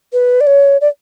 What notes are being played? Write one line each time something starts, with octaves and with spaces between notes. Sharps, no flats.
B4
D5
C#5
D5